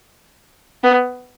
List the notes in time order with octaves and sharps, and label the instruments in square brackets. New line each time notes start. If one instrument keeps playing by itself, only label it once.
[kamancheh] B3